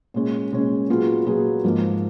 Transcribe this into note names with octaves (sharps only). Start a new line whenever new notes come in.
A#2 G#3 C#4
A#2 G#3 C#4
A#2 F#3 B3 F4 G#4
A#2 F#3 B3 F4 G#4
G#2 F3 A#3